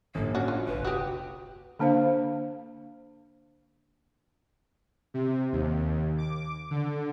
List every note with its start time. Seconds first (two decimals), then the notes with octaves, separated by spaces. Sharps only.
0.15 G1 A2 F#3 A#3
0.35 C#4 D4 F#4
0.48 F4
0.68 F1 A#1 B4
0.85 F#4 G4 D#6
1.79 D3 A#3 D4 C5 F5
5.14 C3
5.53 D#2
6.18 D6
6.71 D3